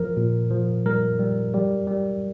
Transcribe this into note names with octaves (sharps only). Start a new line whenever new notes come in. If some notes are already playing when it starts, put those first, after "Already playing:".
Already playing: F3 A#4
A#2
F3
G3 A#4
G3
G3
G3